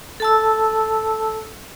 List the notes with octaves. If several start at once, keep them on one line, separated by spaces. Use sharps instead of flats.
A4 A5 E6